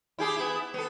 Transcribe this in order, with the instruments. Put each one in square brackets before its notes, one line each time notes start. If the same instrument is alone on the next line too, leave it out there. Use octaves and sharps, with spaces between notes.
[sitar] E4 G4 G#4
B3 E4
B3 A4